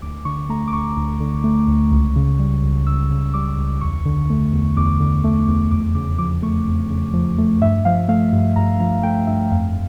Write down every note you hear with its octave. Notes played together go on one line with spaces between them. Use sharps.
D2 D6
D3 C#6
A3 A#5
D6
D2 C#6
D2
D3
A3
D2
C#2
C#3
G3
C#2
C#2 E6
C#3
G3 D6
C#2
E2 C#6
D3
A3
E2
E2 D6
D3
A3
E2
F2 D6
C#3 D6
F3 D6
A3 C#6
F2
C#3
F3
A3
G2 E5
F3 F5
A3 F5
G2
G2 A#5
F3 A#5
A3 G5
G2 E5
F2 F5